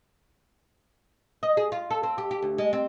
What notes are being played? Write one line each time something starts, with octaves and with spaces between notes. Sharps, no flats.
D#5
G#4
F4
A4
C4
G4
G4
D2
G#3
C4